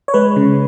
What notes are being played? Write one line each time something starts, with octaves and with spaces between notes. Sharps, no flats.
C#5
G#3 B4
C#3